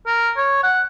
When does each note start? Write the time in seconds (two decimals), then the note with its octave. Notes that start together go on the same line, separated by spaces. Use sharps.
0.07 A#4
0.37 C#5
0.63 F#5